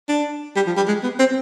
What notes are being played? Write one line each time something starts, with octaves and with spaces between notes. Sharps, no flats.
D4
G3
F3
G3
G#3
B3
C4